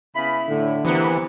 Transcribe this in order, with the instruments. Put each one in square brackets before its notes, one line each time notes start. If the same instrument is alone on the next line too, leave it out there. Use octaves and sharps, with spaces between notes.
[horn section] C#3 B3 B5 [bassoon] E4
[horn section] A2 [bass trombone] D3
[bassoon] C3 [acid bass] E3 [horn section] A#3 B3